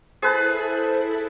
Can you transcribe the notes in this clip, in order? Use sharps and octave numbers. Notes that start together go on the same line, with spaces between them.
E4 G#4 A4 B4 C5 A5 B5